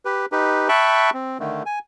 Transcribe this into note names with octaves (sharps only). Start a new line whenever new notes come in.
G4 B4
D#4 G4 B4
E5 G5 A5 B5 C#6 F#6
C4
D3 D#3 A3
G#5